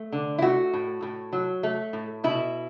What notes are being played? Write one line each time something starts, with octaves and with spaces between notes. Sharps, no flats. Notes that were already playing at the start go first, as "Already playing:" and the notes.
Already playing: A3
D3
E4
A3 F#4
A2
A2
F#3
A3
A2
B2 E4